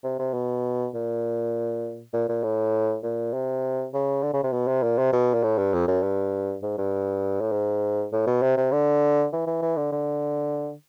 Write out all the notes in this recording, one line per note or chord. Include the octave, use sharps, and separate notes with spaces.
C3
C3
B2
A#2
A#2
A#2
A2
A#2
C3
C#3
D3
C#3
C3
B2
C3
A#2
C3
B2
A#2
A2
G2
F2
F#2
G2
G#2
G2
A2
G#2
A2
B2
C3
C3
D3
E3
E3
E3
D3
D3